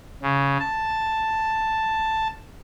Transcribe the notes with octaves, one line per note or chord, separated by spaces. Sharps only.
C#3
A5